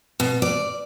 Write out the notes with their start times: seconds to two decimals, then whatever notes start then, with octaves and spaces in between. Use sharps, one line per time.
0.20 B2
0.42 D5